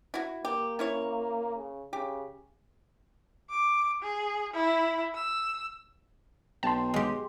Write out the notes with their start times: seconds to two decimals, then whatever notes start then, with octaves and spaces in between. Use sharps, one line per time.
0.14 E4 F#4
0.45 A#3 G4
0.79 C#4 E4 C#5
1.56 C#3
1.93 C#3 G4
3.50 D6
4.02 G#4
4.53 E4
5.15 E6
6.63 B1 G5 A5 C6
6.94 G#3 G4